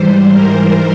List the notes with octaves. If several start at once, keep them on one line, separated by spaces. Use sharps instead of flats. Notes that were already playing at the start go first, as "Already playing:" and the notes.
Already playing: G#2 E3 G3 C5
A#4